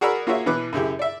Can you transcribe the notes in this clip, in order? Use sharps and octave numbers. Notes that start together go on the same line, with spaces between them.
F#4 G#4 A#4 D5 B5 E6
A#3 F4 F#4 G#4 C#5 E5
B2 E3 B4 D6 F#6
F#2 C#3 E4 G4
D5 E5